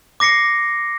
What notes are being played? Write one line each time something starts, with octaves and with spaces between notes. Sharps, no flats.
D6 A#6 C7 C#7